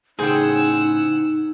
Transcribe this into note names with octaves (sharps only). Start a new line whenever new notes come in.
A2 C#3 D#4 G#4 C5 F#5 G5 E6